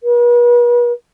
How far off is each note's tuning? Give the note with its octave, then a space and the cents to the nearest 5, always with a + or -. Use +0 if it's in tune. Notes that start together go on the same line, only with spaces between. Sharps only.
B4 -45